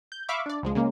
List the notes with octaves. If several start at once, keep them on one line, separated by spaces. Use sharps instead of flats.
G6
E5 F5 B5 C#6 D6
D4 D5
C#2 F3 G#3
C#3 G#3 A#3